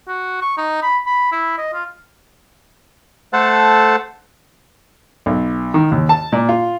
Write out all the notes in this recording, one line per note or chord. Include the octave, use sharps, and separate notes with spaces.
F#4
C#6
D#4
B5
B5
E4
D#5
F4
A3 A4 C5 F#5 A5
B1
D#3
D#2
A5
A#2
F4